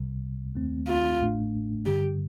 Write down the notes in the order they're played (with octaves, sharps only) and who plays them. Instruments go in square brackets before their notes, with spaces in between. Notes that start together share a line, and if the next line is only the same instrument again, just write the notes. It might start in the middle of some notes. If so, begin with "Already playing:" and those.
Already playing: [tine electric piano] C2 C3 G3
D#2 D#3 A3 C4
[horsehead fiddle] F4
[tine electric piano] A1 A2 A3 D4
[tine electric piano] G2 D3 G3 [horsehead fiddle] G4